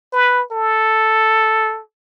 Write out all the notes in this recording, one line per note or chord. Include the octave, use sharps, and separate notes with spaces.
B4
A4